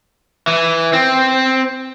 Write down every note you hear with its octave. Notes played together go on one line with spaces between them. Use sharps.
E3
C4